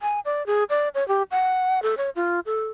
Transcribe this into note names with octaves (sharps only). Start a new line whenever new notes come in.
G#5
D5
G#4
D5
C#5
G4
F#5
A4
C#5
F4
A4